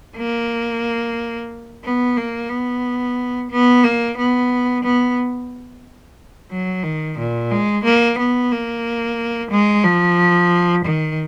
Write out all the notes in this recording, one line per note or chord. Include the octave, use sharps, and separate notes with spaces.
A#3
B3
A#3
B3
B3
A#3
B3
B3
F#3
D#3
A#2
G#3
A#3
B3
A#3
G#3
F3
D#3